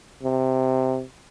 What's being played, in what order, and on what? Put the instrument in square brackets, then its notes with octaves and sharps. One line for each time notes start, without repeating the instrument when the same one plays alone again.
[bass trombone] C3